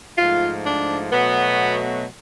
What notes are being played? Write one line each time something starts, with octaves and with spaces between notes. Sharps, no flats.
G#2 F3 A3 F4
D4
B2 F#3 A3 B3